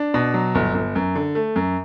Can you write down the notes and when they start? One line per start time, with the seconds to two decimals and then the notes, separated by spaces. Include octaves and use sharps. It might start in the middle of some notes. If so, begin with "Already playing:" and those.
Already playing: D4
0.14 B2
0.34 F#3
0.55 G1
0.74 G1
0.96 F#2
1.15 D3
1.35 A3
1.56 F#2